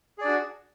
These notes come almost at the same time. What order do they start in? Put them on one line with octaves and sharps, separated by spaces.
G#4 D5 D4 F#4